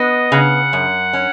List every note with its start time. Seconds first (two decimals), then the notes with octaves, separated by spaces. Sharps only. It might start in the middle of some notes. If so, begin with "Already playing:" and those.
Already playing: B3 D#5
0.32 C#3 F#5
0.73 F#2
1.13 C#4